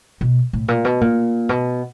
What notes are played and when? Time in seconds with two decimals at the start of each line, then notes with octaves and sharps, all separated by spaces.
0.21 B2
0.53 A2
0.68 A#2
0.85 B2
1.01 A#2
1.49 B2